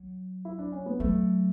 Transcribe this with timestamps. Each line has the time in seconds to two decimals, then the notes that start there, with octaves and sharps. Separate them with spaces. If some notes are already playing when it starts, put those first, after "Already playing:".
Already playing: F#3
0.45 E4
0.59 D4
0.72 C#4
0.86 B3
1.00 F#3 A3